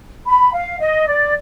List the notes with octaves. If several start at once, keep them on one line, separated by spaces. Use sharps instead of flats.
B5
F5
D#5
D5